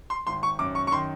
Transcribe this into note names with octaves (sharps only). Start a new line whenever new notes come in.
C6
G#1 C6
C#6
F#2 D6
C#6
C#6
D#3 C6